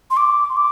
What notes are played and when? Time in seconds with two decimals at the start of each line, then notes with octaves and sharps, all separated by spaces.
0.11 C6
0.17 D6
0.49 C6
0.57 D6